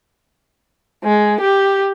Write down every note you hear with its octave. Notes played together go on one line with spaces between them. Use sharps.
G#3
G4